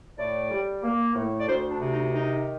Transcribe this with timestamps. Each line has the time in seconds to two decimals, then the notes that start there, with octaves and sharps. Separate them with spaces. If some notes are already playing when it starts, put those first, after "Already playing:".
0.18 A2 D5
0.50 G3
0.84 A#3
1.16 A2
1.40 D5
1.48 D2 C5
1.70 D4
1.81 C3
1.92 D#4
2.13 D#3 D#4